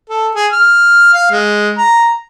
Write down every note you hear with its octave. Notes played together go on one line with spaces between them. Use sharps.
A4
G#4
F6
F5
G#3
A#5